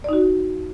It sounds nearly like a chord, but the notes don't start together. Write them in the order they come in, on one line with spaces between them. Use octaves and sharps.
D5 D#4 F#4